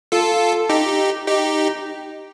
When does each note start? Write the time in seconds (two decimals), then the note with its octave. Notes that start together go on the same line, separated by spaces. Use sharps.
0.12 F4 A4
0.69 D#4 G4
1.27 D#4 G4